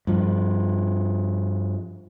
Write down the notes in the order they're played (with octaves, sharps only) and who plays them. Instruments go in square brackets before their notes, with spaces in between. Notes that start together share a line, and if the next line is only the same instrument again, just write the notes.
[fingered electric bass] G2 F3